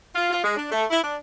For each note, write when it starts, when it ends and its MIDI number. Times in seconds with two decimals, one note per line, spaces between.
0.15 0.29 65
0.31 0.39 65
0.43 0.54 56
0.56 0.70 62
0.71 0.84 57
0.90 1.00 64
1.02 1.16 62